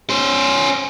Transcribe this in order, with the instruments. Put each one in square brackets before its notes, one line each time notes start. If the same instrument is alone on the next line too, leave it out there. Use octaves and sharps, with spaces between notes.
[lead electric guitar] C#4 C5